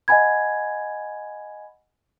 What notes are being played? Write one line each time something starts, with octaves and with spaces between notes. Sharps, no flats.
D#5 F#5 G#5 B5 G#6